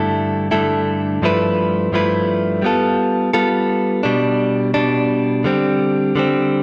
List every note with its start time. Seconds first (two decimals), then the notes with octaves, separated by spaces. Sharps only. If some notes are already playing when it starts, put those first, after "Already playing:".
Already playing: G2 D3 A3 E4 A4
0.51 G2 D3 A3 E4 A4
1.22 G2 F3 A3 E4 B4
1.92 G2 F3 A3 E4 B4
2.62 G3 B3 F4 A4
3.33 G3 B3 F4 A4
4.03 B2 G3 D4
4.74 B2 G3 D4
5.44 D3 G3 C4
6.16 D3 G3 C4